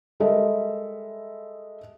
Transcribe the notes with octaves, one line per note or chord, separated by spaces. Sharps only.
G3 G#3 A4 A#4 D#5 E5